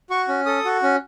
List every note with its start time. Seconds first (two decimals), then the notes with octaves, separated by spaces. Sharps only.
0.10 F#4 C#6
0.28 C#4
0.46 A4 D#6
0.65 F#4
0.83 C#4